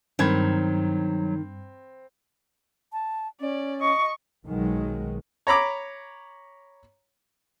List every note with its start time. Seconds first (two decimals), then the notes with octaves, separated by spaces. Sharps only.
0.19 G2 D#3 F#3 C4 B5 G#6
2.93 A5
3.40 C#4 D5
3.82 D#5 C#6
4.45 B1 D#3 F#3 G#3
5.47 C#5 A#5 B5 D6